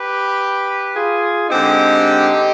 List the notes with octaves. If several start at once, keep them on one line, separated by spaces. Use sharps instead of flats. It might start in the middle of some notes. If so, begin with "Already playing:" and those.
Already playing: G4 B4
F4 G#4
D3 G#3 C4 D#4 G4